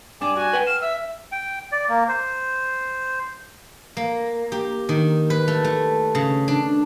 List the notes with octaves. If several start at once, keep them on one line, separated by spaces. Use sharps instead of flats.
G2 D4 G#5 D6
F#4 G#5
B4 F#5 G5
F6 E7
E5 E6
G5
D5
A#3
C5
A#3
G4
D#3
B4
A3
A3
C#3
D4